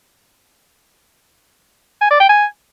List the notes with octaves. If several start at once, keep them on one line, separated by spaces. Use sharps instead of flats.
G#5
D5
G5
G#5